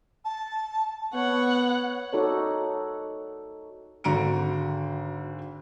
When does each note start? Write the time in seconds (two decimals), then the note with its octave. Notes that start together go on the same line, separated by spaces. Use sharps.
0.25 A5
1.14 B3 C#5 F#5
2.13 D#4 F#4 A4 C#5 D5
4.04 G#1 D3 F#4 A#5 C#7 D7